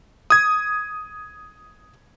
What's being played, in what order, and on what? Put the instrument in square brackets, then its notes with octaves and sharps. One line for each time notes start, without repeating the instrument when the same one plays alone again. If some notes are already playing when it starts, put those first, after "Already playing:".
[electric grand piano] D#6 G#6